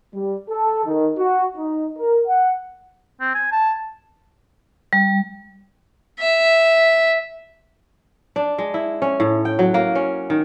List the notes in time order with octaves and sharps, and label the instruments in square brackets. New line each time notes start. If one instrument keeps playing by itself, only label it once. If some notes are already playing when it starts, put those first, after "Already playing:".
[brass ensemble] G3
A4
D#3
F#4
D#4
A#4
F#5
[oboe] C4
G#5
A5
[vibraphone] G3
[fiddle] E5
[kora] D4
G#3
E4
C#4
A2
G5
F#3
A#3
C#4
D#3